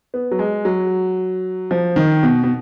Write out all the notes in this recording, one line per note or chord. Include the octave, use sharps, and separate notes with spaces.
B3
F#3
G#3
F#3
F3
D#3
B2
B2